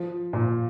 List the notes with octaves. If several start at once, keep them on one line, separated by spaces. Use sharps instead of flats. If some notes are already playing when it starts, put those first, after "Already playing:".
Already playing: F3
A#2